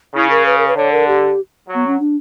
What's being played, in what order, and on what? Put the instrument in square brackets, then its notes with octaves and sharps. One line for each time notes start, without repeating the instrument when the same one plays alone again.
[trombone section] C#3 [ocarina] E4
[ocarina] A#4
B4
A#4
B4
[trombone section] D3 [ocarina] C#5
[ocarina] A#4
G4
[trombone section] F#3
[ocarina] B3
C#4
D4